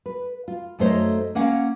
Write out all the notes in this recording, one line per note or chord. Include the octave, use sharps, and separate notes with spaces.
B4
F4
F#2 A3 D#4 C5 C#5 D#5
A#3 C#4 F5 F#5